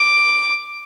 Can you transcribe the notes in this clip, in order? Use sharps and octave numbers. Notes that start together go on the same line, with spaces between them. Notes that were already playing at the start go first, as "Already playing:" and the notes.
Already playing: D6